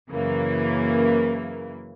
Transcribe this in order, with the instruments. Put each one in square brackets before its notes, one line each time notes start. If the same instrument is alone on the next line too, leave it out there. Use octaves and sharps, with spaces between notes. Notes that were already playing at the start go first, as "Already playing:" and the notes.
[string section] F#2 C#3 E3 A#3